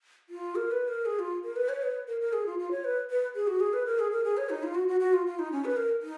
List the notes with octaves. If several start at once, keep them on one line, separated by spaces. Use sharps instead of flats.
F4
A#4
B4
A#4
G#4
F4
A#4
B4
C#5
B4
A#4
A#4
G#4
F4
F4
C#5
B4
B4
G#4
F#4
G#4
B4
A#4
G#4
A#4
G#4
C#5
D#4
F4
F#4
F#4
F#4
F4
F4
D#4
C#4
B4
A#4
D#4